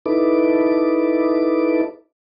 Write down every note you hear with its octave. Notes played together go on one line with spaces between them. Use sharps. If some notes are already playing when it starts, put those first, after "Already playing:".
D#4 E4 A4 B4 D6